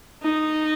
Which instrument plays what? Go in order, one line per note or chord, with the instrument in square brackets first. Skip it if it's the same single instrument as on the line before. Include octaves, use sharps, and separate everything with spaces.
[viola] D#4